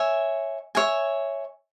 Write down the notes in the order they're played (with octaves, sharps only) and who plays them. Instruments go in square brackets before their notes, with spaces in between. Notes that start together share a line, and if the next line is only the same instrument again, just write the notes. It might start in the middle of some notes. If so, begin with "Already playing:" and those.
Already playing: [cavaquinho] C#5 E5 G#5
C#5 E5 G#5